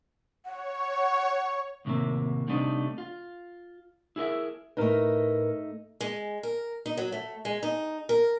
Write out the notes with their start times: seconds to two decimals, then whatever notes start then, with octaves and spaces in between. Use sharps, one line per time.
0.46 C#5 F#5
1.85 D#2 A2 C3 A3 A#3
2.48 C3 G3 A3 D4 D#4
2.98 F4
4.16 E4 G#4 A#4 D#5 E5
4.77 A2 A3 D#4 A#4 B4
6.01 G#3
6.43 A#4
6.86 D#4
6.97 F#3
7.12 A3
7.45 G#3
7.63 D#4
8.09 A#4